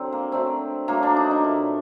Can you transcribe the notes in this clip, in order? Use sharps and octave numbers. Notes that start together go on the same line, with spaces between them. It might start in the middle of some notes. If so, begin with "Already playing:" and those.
Already playing: D3 F#3 C4
A#3
D3 F#3 A3 C4
D3 F#3 A3 A#3
D4
D#4
D4
A#2 A3